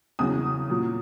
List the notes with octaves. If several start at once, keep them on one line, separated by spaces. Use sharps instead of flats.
E2 C#3 F#3 D#6
A#2 F#3